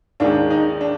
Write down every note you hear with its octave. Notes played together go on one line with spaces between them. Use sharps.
D#2 D#3 G#3 D4
D#4
D4